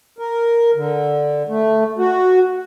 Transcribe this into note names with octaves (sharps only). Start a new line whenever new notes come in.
A#4
D3
A3
F#4